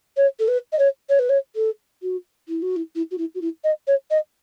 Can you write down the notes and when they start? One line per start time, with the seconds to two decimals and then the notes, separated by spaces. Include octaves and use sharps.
0.17 C#5
0.39 A4
0.48 B4
0.72 D#5
0.78 C#5
1.09 C#5
1.19 B4
1.29 C#5
1.55 A4
2.02 F#4
2.48 E4
2.62 F#4
2.76 E4
2.95 E4
3.11 F#4
3.18 E4
3.34 F#4
3.41 E4
3.64 D#5
3.87 C#5
4.10 D#5